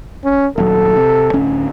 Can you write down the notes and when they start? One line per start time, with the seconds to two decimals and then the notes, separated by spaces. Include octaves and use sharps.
0.25 C#4
0.58 D#1 F#3 A4
0.97 C3
1.33 D1 C#4